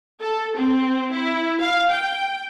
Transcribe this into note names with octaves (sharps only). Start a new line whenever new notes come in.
A4
C4
E4
F5
G5